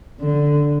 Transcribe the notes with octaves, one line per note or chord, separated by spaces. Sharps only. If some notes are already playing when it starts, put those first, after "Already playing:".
D3